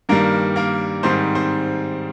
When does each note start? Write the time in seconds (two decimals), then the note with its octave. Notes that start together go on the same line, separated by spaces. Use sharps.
0.09 G2 D#3 G3 A#3 A#4
0.56 A#3 A#4
1.03 G#2 D#3 G3 C4 C5
1.35 C4 C5